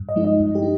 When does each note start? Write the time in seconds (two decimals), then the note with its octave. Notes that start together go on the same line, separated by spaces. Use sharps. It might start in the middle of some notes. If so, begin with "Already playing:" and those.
Already playing: G2
0.09 D#5
0.16 F3 G#3 D#4
0.24 D#5
0.39 G2
0.55 G4
0.62 D#4